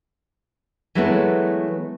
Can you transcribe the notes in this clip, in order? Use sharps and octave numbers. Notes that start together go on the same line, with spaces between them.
E3 F#3 G#3 A3 B3 E4